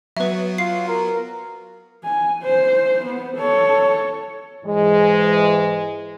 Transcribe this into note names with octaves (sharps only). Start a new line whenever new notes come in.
F#3 B3 B4 E5
F4 C7
A#4
G#5
C5
B3
A4 C#5
G#2 E3 G#3